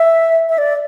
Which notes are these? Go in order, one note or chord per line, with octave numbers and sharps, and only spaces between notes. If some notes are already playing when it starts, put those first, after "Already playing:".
Already playing: E5
E5
D5